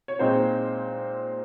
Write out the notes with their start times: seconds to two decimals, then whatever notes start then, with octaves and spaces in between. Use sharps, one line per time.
0.08 C#5
0.19 A#2 G#3 C4 D#4 C5